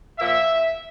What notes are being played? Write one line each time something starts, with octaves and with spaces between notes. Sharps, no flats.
A#2 F3 A#3 E5